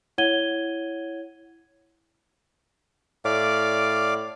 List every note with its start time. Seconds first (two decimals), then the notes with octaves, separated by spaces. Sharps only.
0.18 E4 C#5 F#5 G#6 D#7 G7
3.25 A2 D5 F5 D6